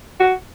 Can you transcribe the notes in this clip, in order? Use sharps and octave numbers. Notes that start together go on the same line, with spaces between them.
F#4